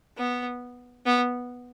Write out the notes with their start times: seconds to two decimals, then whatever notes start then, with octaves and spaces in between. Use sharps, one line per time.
0.18 B3
1.06 B3